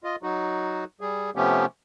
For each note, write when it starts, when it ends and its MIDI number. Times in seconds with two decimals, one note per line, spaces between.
0.04 0.16 65
0.04 0.16 75
0.23 0.84 54
0.23 0.84 63
0.23 0.84 66
1.01 1.30 55
1.01 1.30 68
1.36 1.65 48
1.36 1.65 53
1.36 1.65 57
1.36 1.65 59
1.36 1.65 61
1.36 1.65 67